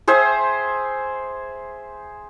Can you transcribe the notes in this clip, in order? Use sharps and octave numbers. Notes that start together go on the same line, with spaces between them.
G#4 C5 E5 G5